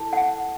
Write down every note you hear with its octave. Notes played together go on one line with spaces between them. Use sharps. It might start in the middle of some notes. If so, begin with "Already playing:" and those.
Already playing: E4 A4 C#5 A5
F#5